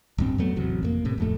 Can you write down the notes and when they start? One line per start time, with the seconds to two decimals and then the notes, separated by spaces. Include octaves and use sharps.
0.18 D1 G2 C4
0.38 E2 F#3 A3 B3
0.56 A1 C3 F#3
0.83 F2 A3 A#3
1.05 A2 C3
1.18 D1 F2 A3